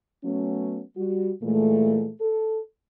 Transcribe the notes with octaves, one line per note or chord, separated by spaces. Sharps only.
F#3 A3 B3 C#4
G3 F#4
A#2 E3 G#3 A3
A4